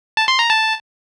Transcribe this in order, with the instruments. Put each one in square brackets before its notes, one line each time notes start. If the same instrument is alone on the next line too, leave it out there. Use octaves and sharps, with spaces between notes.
[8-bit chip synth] A5
C6
A#5
A5